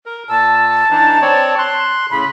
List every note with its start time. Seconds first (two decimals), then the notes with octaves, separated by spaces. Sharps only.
0.06 A#4
0.29 A#2 A5 E6
0.91 E3 D4 D#4
1.22 C4 C#5 D5
1.58 C6 F#6
2.11 A2 C#3 B5